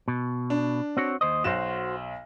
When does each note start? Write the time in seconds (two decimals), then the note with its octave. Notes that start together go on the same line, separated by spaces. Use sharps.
0.08 B2
0.50 D4
0.97 C4 F#4 C#5
1.21 D#2 C5 D#5
1.44 B1 F#4 C5 E7